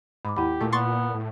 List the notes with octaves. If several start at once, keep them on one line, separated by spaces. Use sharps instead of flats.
G#2 B5 D6
D#2 E4 G4 F#5 B5
A#2 A3
B3 C6 C#6 A6
A2